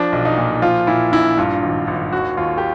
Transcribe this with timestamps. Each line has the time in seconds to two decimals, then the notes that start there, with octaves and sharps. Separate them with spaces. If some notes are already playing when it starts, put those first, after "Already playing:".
Already playing: F3 D4
0.13 B1
0.25 D#4
0.38 A#2
0.62 F3 F4
0.87 A#2 E4
1.12 A#1 E4
1.37 G2 F4
1.63 G#1
1.87 G#1
2.12 D#2 F#4
2.37 D#2 F4
2.58 G4